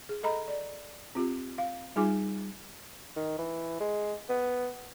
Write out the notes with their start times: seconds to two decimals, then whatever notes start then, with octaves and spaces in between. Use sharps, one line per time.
0.09 G#4
0.23 A4 D#5 A#5 B5
0.48 D5
1.15 C4 F4 G4
1.58 F5
1.96 G3 D#4 F4 G#4 G#5 D6
3.16 D#3
3.39 E3
3.80 G#3
4.29 B3